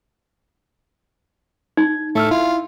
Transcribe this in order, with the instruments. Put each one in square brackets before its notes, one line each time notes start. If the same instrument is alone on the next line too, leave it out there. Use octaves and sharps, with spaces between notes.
[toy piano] D#4 [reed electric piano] G#6
[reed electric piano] A2 E6 F6 [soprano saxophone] A3
[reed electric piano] E4 [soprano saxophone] F4